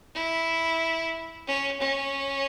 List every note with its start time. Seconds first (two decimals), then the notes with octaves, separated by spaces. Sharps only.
0.15 E4
1.47 C#4
1.80 C#4